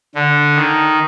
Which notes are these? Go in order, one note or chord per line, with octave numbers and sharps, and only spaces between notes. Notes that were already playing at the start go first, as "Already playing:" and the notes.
D3
D#3